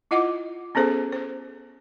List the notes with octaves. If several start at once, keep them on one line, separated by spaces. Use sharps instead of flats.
E4 F4 D#5 F#5 D6
B3 C#4 G#4 A4 C5
C5